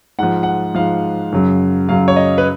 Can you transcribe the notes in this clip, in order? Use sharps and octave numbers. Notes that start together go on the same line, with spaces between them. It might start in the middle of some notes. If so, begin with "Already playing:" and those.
G#2 F3 F#5
F#5
G#2 F3 F5
F#2 C#3 F#3
F#2 C#3 F#3 F5
C#5
D#5
B4